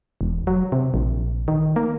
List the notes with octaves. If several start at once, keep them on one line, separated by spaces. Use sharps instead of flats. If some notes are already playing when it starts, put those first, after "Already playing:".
E1
F#3
C3
A#1
D#3
A#3